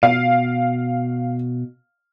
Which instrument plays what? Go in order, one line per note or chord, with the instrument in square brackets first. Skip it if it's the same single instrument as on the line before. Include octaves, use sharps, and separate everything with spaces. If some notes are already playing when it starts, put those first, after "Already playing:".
[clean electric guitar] B2 [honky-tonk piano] F5